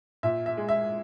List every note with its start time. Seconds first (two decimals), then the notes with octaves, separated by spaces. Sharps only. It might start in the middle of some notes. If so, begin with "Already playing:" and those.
0.23 A#2 E5
0.46 E5
0.57 G#3
0.69 E5